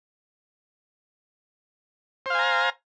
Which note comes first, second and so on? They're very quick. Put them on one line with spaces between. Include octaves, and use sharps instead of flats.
C5 F5 G#5 A#5